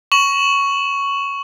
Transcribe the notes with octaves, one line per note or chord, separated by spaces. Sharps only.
C#6 E7 F#7